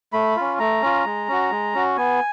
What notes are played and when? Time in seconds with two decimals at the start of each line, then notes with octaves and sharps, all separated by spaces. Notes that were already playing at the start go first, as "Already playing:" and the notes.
0.13 A3 B5
0.36 C#4 F4
0.59 A3 A#5
0.82 C#4 F4
1.05 G#3
1.28 C#4 F#4
1.51 G#3
1.74 C#4 F#4
1.97 B3 G#5